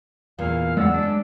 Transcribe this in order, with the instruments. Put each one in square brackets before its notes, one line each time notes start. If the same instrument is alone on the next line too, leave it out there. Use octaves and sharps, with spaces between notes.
[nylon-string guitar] E2 A#2 [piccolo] F5
[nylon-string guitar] E2 [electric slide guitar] G#3 D5 F#5 [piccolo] E6
[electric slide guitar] G#3 D4
[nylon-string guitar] C#4